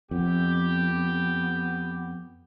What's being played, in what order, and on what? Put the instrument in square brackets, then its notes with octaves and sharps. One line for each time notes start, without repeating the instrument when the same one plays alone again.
[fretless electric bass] F2 [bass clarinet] B3 [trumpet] G4